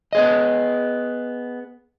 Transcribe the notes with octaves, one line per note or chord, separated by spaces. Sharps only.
B3 G#4 D#5